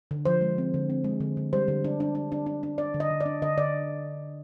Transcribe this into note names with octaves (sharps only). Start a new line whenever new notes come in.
D3
F3 C5
G#3
C4
D3
C4
G#3
D3
D3
G3 C5
D3
D4
D4
D4
D4
D4
D4
D4 D5
D3
D#5
D3
D5
D4
D3 D#5
D3 D5